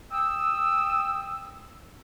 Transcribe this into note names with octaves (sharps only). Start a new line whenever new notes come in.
G5 D#6 E6